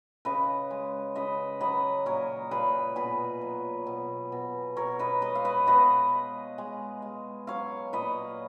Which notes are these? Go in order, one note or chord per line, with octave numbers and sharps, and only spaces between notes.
C#3 B4 D#5
G#3
C#3 B4 D#5
F#3 B4 D#5
A#2 A#4 C#5
A#2 G#4 B4
B2 G#4 B4
F#3
B2
B2
B2 A#4 C#5
B4 D#5
G#3 B4 D#5
F5
B4 D#5
B2 B4 D#5
G#3
G#3
G#3
F#3 C#5 F5
A#2 B4 D#5